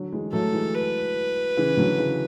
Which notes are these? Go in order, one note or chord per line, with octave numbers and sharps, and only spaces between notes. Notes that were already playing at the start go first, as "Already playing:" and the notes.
Already playing: D3 F#3
E3 G#3
F#3 A3 A4
E3 G#3
B4
C#3 E3
D3 F#3
C#3 E3